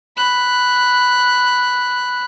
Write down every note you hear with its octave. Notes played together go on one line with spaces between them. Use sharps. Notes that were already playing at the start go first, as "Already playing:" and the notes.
B5 F#6